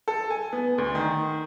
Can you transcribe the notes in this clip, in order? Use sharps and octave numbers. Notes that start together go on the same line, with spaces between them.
A4
G#5
B3
D2
D#3